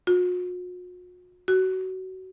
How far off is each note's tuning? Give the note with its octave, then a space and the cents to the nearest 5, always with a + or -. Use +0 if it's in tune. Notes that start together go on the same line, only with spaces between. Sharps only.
F#4 -45
F#4 +20